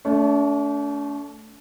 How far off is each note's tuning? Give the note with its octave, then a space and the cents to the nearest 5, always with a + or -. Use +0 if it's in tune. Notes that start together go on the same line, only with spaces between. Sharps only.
A3 +0 D4 -45